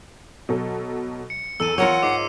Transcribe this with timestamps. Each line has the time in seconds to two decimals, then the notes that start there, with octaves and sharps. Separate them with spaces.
0.49 B2 F#3 A4
1.30 C#7
1.60 E2 A4 E6 D#7
1.78 F4 A#4 C#5 F#5
2.03 G#2 D6 C7